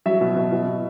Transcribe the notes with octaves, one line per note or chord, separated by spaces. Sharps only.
F#3 E5
B2
B2
B2
B2